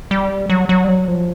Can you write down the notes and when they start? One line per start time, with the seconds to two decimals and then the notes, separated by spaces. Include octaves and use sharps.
0.11 G3
0.50 F#3
0.69 F#3
0.84 G3
0.88 F#3
1.08 F3